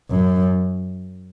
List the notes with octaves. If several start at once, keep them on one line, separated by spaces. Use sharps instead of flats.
F#2